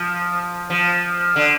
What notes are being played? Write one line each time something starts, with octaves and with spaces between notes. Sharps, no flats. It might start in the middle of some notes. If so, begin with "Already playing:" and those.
Already playing: F3
F3
D3